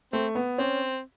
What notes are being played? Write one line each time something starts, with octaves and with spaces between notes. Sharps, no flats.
A3 C4
B3
C4 C#4